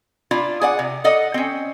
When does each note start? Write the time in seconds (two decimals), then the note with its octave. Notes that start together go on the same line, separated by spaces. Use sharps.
0.31 D4 E4 F4
0.61 G#4 D5 F#5
0.79 C3
1.04 A4 D5 D#5 F#5
1.34 C4 C#4